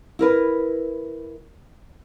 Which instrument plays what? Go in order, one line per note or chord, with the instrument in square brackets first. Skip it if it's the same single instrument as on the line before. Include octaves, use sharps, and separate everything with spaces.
[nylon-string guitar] E4 A#4 B4